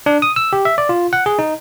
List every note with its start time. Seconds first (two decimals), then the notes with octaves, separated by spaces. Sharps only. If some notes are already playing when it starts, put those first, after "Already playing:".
0.06 D4
0.22 D#6
0.36 E6
0.53 G4
0.65 E5
0.78 D5
0.89 F4
1.13 F#5
1.26 G#4
1.39 D#4